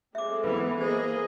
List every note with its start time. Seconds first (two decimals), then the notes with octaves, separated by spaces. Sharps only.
0.15 G#3 C4 A4 E5 D6
0.44 E3 B3 B4
0.81 A#3 G#4 C5 D#5